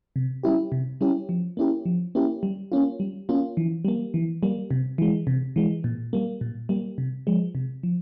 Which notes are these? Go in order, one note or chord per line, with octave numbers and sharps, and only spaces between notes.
C3
G3 C#4 E4 G4
C3
G3 C#4 E4 G4
F3
A#3 C#4 E4 G4
F3
A#3 C#4 E4 G4
G3
A#3 C#4 F4
G3
A#3 C#4 F4
E3
G3 A#3
E3
G3 A#3
C3
E3 G#3
C3
E3 G#3
A#2
G3 A#3
A#2
G3 A#3
C3
F3 G#3
C3
F3